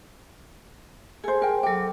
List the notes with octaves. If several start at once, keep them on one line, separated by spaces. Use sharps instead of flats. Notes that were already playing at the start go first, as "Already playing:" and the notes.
G#4 A4 C5 G#5
A#4 G5
F#3 A4 G5 D6